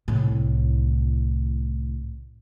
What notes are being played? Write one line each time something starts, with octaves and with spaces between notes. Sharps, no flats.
C2 A2